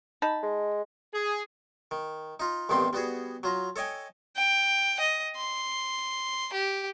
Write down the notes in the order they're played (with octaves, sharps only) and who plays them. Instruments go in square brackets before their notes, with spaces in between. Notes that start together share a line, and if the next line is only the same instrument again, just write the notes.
[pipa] D#4 A5 B5
[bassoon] G#3
[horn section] G#4
[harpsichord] D#3
D#4 F4
A1 G2 D#3 B3 C4 C6
G3 B3 F#4 G#4
F#3 F4 A#5
A4 C#5 D#5 G5 G#5
[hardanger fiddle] G5
D#5
C6
G4